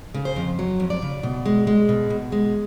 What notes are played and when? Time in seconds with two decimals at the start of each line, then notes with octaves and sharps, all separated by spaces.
0.14 C#3
0.25 C5
0.36 F2
0.59 F#3
0.80 F2
0.90 D5
1.02 C#3
1.23 B2
1.46 G#3
1.67 G#3
1.89 B2
2.10 B2
2.32 G#3